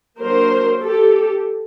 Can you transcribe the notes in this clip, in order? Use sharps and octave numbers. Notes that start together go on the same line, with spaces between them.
F#3 A#3 D4 A#4 C5
G4 A4